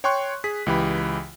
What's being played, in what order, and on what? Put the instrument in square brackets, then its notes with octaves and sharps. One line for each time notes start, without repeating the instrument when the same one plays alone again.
[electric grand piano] C#5 G5 C6 C#6 F#6
G#4 B6
C#2 E3 G4 B5